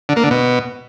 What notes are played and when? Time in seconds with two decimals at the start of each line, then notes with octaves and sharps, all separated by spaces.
0.09 D3
0.16 A#3
0.24 D3
0.31 B2